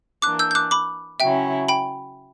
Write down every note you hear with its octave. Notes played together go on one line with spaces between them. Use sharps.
E3 A#3 D4 D6 F#6
E6 G6
G6
D6 F#6
B5 D6
C#3 F#3 C#4 E4 E5 G5
G5 B5